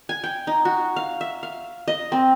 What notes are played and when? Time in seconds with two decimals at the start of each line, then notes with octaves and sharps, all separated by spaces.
0.09 G#5
0.24 G5
0.47 D#4
0.65 F#4
0.96 F5
1.21 E5
1.43 F5
1.88 D#5
2.12 C4